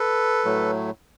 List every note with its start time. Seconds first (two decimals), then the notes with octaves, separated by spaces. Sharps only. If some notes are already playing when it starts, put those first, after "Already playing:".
Already playing: A4 B4
0.45 A2 F#3 A3